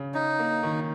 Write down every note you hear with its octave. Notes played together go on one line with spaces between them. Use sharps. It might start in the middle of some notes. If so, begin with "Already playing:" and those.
Already playing: C#3
C#4 D#4
A#3
D#3